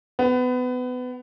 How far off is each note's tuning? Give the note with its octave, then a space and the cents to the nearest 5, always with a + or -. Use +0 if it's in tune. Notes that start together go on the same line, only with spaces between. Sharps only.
B3 +25